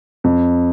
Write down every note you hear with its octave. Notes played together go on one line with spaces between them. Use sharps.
F2